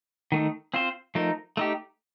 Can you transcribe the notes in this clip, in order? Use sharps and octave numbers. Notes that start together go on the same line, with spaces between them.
D#3 A3 D#4
C4 F4 C5
F3 A3 D#4 A#4
A3 D#4 G4